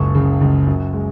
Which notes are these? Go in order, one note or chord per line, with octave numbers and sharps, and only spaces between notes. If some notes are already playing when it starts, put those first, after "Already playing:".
Already playing: F#1 C#2 C#6
C#3
C#2
F#2
G#3